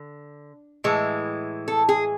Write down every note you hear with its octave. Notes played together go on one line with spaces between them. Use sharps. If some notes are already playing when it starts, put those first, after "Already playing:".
Already playing: D3
A2 E3 G#3
A4
G#4